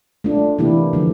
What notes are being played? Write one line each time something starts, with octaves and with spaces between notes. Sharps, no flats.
A3 D4 F4
C3 E3 A#3 E4 G4
D3 F3 A3